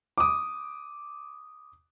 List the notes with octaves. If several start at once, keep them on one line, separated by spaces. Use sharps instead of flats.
D6 D#6